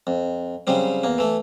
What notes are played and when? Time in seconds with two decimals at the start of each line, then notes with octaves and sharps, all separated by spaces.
0.07 F2
0.67 C#3 F#3 G3 C4
1.03 E2 A#3
1.18 E3 A3